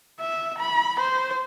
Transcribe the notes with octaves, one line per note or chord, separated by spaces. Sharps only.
E5
B5
C5